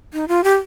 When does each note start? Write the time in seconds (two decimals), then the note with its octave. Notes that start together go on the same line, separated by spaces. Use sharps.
0.13 D#4
0.28 F4
0.44 G4